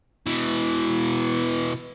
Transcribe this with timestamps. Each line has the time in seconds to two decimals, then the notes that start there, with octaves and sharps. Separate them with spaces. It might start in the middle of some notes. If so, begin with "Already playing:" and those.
0.27 B2 E3